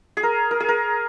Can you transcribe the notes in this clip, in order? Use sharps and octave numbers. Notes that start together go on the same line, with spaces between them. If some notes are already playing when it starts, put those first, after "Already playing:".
G#4
A#4
A#4
G#4
A#4